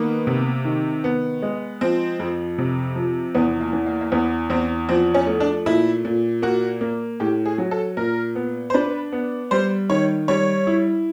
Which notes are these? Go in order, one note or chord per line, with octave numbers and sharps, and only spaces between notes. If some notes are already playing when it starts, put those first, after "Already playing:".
Already playing: D#3 A#3 B3
C3
D#3
B3
G#3
F3 C4
F2
C3
F3
E2 B3
A#3
E3
A#3
A#3
E2 B3
E2 C4
F3 C4
C#4
A3
D4
A#2 E4
A#2
A#3 F#4
A#3
A2 G4
G#4
F#3
A4
A#2 A#4
B3
C5
D4 B4
B3
G3 C5
D#3 C#5
G3 C#5
E4